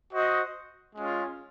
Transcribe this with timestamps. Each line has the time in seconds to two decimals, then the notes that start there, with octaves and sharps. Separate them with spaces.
0.12 F#4 C5 D#5
0.94 G#3 C#4 F4